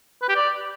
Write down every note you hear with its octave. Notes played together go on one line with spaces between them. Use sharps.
B4
G4
D5